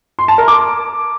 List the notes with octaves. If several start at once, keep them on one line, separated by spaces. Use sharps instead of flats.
C6
A5
A#4
D6